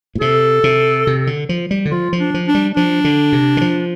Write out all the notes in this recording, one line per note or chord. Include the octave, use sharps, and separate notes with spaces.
A2
C3 A4
C3
C3
D3
F3
G3
D3
F3 F4
F3
D4
F3
D4
G3
F3 D4
D3
C3
D3
F3